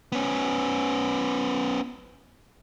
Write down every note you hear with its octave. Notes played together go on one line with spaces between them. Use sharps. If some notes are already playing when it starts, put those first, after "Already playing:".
B3 C#4